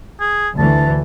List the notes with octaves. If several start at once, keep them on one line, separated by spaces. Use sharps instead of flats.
G#4
D2 E3 A5